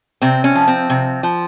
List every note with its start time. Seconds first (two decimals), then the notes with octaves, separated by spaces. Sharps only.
0.22 C3 C4
0.44 C#4
0.55 F3
0.68 C4
0.90 C3
1.23 F3